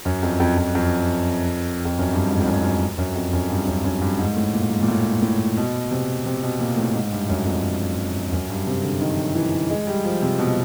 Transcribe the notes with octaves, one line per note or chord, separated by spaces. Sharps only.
F#2
F2
F2
F2
F2
F2
F#2
G2
G#2
F2
F#2
F#2
F#2
F2
F#2
G2
F#2
F#2
G2
G#2
A2
A#2
G#2
A#2
A2
A2
B2
C3
C3
B2
A#2
A2
G#2
G2
F#2
F2
F#2
G2
C3
D3
D#3
E3
G#3
G3
F3
C3
B2